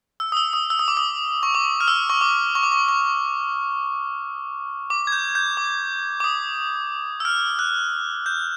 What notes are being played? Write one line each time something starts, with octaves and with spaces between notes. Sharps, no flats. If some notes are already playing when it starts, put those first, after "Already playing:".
E6
D#6
E6
D#6
E6
D#6
D6
D#6
C#6
D6
F6
E6
C#6
D6
C#6
D6
C#6
C#6
D6
G#6
G6
G6
D6
D6
D#6
E6
F6
F#6
G6